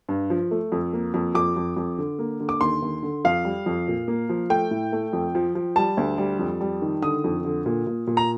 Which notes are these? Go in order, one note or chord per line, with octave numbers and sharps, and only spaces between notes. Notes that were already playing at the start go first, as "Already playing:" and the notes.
G2
F3
A3
F2
A#3
F2
F2 D6
F2
F2
D3
A#3
D3
D6
D#2 C6
D#2
D3
F2 F5
G3
F2
A#2
A#3
F3
A3 G5
A2
A3
F2
F3
F3
G3 A5
D2
G3
F2
G3
D#3
D3 D#6
F2
D3
A#2
A#2
A#2
A#5